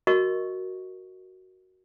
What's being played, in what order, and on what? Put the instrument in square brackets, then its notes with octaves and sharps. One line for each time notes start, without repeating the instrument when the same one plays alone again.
[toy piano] F#4 A#4 D#5 C#6